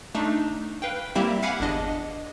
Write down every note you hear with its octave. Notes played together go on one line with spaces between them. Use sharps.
A3 D4 D#4
B4 F5 G5
G3 A#3 C4 E4 G4 E5
F5 F#5 G#5 B5 D6
G1 E2 D4 D#5